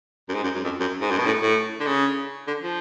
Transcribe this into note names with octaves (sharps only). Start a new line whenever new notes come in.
F#2
G#2
F#2
F#2
F2
F#2
G#2
F#2
B2
A2
A2
D3
C#3
D3
F3